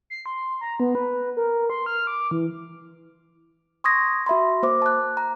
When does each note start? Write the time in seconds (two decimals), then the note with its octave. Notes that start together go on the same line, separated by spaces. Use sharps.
0.10 C7
0.26 C6
0.61 A#5
0.80 B3
0.95 B4
1.37 A#4
1.70 C6
1.86 F6
2.07 D6
2.31 E3
3.84 C6 C#6 D#6 G#6 A#6
4.26 F#4 E5 B5 C6
4.63 A#3 C5 D6
4.82 A5 F#6
5.17 A#5